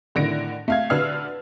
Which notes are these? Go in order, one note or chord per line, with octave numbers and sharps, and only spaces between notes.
A2 D3 D#3 A#6 D7
A3 F5 G#6
D3 D4 B4 E6 F6 C7